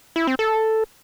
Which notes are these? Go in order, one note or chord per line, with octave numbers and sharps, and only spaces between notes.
E4
C4
A4